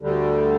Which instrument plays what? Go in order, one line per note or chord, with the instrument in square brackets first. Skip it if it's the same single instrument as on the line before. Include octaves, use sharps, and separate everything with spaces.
[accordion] D2 D3 G3